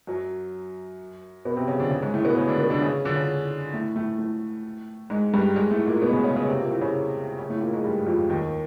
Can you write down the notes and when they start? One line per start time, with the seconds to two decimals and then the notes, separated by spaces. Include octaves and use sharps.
0.07 F#2 F#3
1.45 B2 B3
1.57 C3 C4
1.68 C#3 C#4
1.80 D3 D4
1.91 C#3 C#4
2.02 G#2 G#3
2.14 A2 A3
2.24 B2 B3
2.37 C#3 C#4
2.48 D3 D4
2.59 B2 B3
2.70 D3 D4
2.82 C#3 C#4
3.05 D3 D4
3.16 C#3 C#4
3.73 A2 A3
3.96 A2 A3
4.18 A2 A3
5.10 G#2 G#3
5.33 G2 G3
5.56 G#2 G#3
5.71 A2 A3
5.87 A#2 A#3
6.02 B2 B3
6.13 C#3 C#4
6.24 C#3 C#4
6.36 C#3 C#4
6.47 C3 C4
6.59 A#2 A#3
6.70 A2 A3
6.81 C#3 C#4
7.39 C#3 C#4
7.50 A2 A3
7.61 A#2 A#3
7.73 G#2 G#3
7.84 G2 G3
8.07 F2 F3
8.29 D#2 D#3